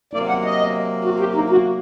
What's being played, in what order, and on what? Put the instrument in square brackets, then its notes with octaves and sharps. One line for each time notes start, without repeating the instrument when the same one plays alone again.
[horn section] C3 F#3 A#3 [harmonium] D5
[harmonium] F#5
D#5
F#4
G4
D#4
F#4